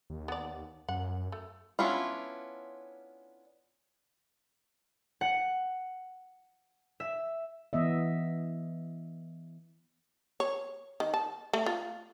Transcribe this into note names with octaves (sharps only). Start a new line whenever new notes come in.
D#2
B3 D5
F#2 F#5
A3
B3 C#4 D4 E4 F4
F#5
E5
E3 B3 D#5 E5
C#5
D#3
A5
A3
F4